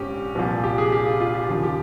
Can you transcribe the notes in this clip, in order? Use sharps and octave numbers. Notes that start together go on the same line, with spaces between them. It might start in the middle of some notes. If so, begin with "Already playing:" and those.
Already playing: A#1 G#2 F3 C4 C#4 G4
C2 A#2 F3
G4
G#4
G4
F4
F4
G4
D#2 C#3 F3
G4